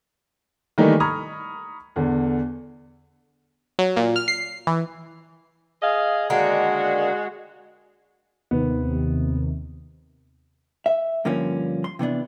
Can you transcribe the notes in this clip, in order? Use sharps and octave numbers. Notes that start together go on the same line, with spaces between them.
D#3 E3 G3 A3 A#3 D#4
A#5 B5 C#6 D#6 F6 G#6
E2 D3
F#3
A#2
F6
C7
E3
G#4 D#5 F5
D3 D#3 G#3 A#3 F#4
D#2 C3 D#3 B3
E5
G2 D3 F3 A#3 C#4
C6
C3 E3 B3 D4